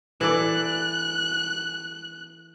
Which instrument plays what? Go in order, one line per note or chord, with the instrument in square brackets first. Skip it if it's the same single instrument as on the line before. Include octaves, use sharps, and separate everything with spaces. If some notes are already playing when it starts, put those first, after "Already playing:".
[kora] E3 A4 D5 [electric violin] F#6